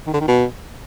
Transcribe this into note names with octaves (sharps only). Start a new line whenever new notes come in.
D#3
D3
D#3
B2